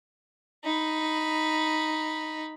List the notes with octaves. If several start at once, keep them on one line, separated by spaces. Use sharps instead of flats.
D#4 B5